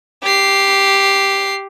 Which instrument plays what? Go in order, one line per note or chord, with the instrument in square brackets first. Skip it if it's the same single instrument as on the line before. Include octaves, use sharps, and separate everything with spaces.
[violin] G4 C7